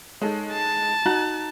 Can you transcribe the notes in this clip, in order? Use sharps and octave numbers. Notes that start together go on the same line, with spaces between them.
G#3 D#4 A4 C#5
A5
D#4 F#4 F#5 A#5 F#6